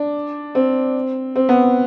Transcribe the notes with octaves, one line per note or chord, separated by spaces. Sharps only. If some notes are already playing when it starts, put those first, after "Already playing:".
Already playing: D4
C4
C4
B3